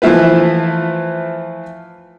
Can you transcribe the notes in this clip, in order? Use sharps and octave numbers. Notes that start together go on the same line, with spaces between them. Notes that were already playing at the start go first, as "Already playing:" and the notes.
E3 F3 A3 E4 F4 B4